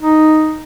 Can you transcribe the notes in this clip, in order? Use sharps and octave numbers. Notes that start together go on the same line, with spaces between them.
D#4